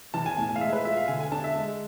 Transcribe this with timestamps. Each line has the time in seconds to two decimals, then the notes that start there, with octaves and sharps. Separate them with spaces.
0.14 E3 A5
0.26 G#5
0.37 A2 G#5
0.49 G#5
0.56 F5
0.61 G#3 E5
0.73 B4
0.85 F4 E5
0.97 F5
1.08 D3 G#5
1.20 G#5
1.31 D4 A5
1.44 E5
1.56 G#3